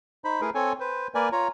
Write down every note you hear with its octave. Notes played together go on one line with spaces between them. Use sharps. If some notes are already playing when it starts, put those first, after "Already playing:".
D#4 C5 B5
A3 E4 G#4 A#4 B4
C4 A4 C#5 G#5
B4 C5
A#3 A#4 B4 D5 G#5
F4 C#5 A#5